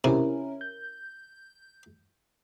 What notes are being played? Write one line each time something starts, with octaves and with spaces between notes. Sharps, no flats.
C3 C#4 E4 A#4
G6